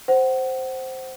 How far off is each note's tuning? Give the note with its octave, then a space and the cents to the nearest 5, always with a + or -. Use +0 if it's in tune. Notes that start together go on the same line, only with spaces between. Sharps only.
C5 +0 F#5 +25